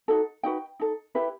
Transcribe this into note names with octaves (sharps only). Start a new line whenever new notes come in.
D#4 F#4 A4
D#4 F#4 B4 G5
D#4 A4
E4 G4 B4